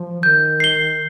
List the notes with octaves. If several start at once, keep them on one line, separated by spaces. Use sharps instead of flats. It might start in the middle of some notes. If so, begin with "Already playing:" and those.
Already playing: F3
D#3 G6
C7 G7